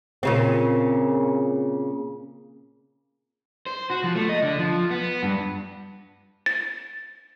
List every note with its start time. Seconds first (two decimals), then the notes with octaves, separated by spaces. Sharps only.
0.23 A#2 C#3 C4
3.66 C5
3.90 F#4
4.04 F3
4.16 A3
4.29 D#5
4.43 D3
4.59 F3
4.91 B3
5.23 G2
6.46 A6